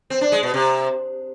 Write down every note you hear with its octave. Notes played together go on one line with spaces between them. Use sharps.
C4
D4
G#3
B2
C3